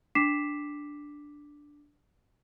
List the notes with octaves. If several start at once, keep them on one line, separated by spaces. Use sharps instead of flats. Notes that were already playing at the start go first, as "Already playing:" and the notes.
D4 D6 B6 C7 E7